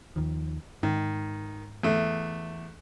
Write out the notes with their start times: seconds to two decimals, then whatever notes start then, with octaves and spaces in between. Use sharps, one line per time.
0.16 D#2 D#3 F3
0.83 G#2 D#3
1.83 E2 A3